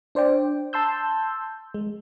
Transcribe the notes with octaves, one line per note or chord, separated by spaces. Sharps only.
D4 C5 D5 G5
A5 C6 E6 G6
G#3